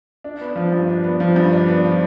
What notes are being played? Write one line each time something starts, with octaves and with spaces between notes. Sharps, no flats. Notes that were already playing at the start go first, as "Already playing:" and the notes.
D4
B3
F3
G2
D4
B3
F3
G2
D4
B3
F3